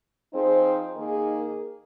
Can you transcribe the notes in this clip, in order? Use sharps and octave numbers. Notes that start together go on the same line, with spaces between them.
F3 C4 D#4 G#4 C5
D#3 A#3 D#4 G#4